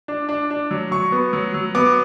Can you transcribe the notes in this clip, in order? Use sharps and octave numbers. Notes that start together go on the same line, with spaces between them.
D4
D4
D4
F#3
F#3 C#6
B3
F#3
F#3
B3 D6